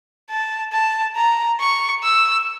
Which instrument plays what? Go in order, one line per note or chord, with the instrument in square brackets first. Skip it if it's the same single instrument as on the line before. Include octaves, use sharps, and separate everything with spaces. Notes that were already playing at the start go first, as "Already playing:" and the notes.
[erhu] A5
A5
A#5
C#6
E6